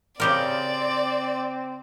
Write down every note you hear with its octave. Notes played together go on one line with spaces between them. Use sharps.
C#3 C4 G4 A#4 D5